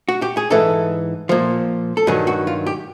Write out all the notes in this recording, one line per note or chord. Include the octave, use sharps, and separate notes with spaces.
F#4
G4
G#4
G#2 E3 A4
A#2 F3
A4
G2 D#3 F#3 G#4
F#4
F4
G4